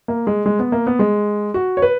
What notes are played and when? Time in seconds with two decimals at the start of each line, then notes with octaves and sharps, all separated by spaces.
0.08 A#3
0.27 G#3
0.46 G#3
0.59 B3
0.72 A#3
0.87 B3
0.99 G#3
1.54 F#4
1.77 C#5
1.82 B4